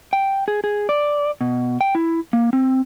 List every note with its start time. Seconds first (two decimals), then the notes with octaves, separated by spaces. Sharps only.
0.13 G5
0.48 G#4
0.64 G#4
0.89 D5
1.41 B2
1.81 G5
1.95 E4
2.33 A#3
2.53 C4